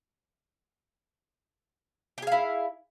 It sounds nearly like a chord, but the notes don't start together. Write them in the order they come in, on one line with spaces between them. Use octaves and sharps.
G4 G#4 F5 E4